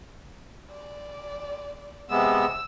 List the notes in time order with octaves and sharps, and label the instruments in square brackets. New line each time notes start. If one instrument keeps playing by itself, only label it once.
[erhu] D5
[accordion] C3 G#3 B3 [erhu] E6